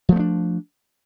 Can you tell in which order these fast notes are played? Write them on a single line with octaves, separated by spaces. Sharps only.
F3 A3 B3 D4